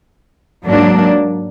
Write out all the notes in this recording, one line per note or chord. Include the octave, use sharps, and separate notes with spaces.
G#2 F#3 A#3 D4